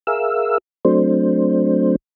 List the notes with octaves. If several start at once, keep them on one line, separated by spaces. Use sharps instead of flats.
G#4 A#4 E5 F5 E6
F#3 A3 C4 D4 C5